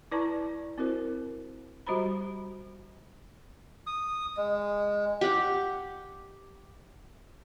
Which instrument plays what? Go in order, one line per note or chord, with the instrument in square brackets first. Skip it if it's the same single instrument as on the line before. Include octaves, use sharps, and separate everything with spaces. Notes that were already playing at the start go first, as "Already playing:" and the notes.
[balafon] E4 B4 D5 A5 A#5 C#6
C4 E4 F#4 A#4 C5
G3 F#4 G4 C5 A#5 B5
[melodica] D#6
G#3
[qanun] G4 F#5